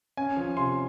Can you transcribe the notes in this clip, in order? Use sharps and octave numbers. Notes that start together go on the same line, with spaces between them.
C#4 G#5
F3
C3 C6